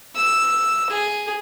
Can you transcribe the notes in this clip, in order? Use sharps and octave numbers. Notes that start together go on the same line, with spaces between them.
E6
G#4